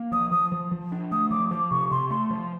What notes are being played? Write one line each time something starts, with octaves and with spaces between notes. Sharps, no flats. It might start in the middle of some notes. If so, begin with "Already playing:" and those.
Already playing: A#3
F3 D#6
F3 D#6
F3
F3
D4
A3 D#6
F3 D6
F3 D6
C3 C#6
C3 C6
A3 C6
F3